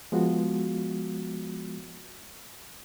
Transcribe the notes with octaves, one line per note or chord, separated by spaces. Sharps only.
F3 G#3 B3 F4 F#4